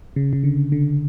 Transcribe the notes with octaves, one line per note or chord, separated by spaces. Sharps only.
C#3
C#3
D3
D3